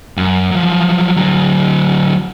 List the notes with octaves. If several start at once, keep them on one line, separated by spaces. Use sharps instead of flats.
F#2
F3 F#3
D3 F#3